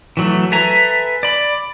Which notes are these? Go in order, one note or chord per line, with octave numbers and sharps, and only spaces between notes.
E3 F#3 A3
A4 B4 E5 G#5 A#5
D5 B5